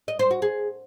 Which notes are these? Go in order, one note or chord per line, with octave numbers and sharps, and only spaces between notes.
D#5
C5
F#4
G#4